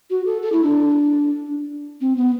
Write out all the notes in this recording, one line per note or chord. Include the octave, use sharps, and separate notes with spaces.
F#4
A4
A4
E4
D4
C4
B3